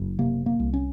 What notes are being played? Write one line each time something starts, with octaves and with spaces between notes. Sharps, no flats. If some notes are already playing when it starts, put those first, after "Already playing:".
Already playing: F#1
C3 A#3
A#3
C2
C#4